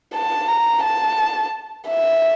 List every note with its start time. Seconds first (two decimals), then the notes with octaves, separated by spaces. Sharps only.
0.14 A5
0.48 A#5
0.83 A5
1.88 E5